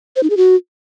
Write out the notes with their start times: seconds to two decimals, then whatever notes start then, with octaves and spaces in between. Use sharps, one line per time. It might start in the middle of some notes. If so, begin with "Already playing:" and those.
0.16 C5
0.23 D#4
0.30 G#4
0.37 F#4